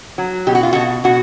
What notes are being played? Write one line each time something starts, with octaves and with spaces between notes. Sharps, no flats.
F#3
B2 G4
F#4
F4
B2 F#4
B2 F#4